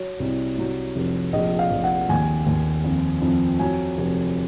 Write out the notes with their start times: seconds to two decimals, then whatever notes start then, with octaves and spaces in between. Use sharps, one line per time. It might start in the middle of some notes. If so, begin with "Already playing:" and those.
Already playing: F#3 C#5
0.20 C2
0.58 F#3
0.96 F1
1.33 A#1 D#5
1.59 F5
1.71 A#1
1.84 F#5
2.09 D#2 G#5
2.47 D#2
2.84 F2
3.22 F2
3.59 F#3 G#5
3.98 F1